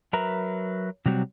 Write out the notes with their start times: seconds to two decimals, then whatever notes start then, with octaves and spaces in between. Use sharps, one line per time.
0.13 F#3 A#4 B4 E5 A#5
1.06 C3 F#3 G3 C4 F#4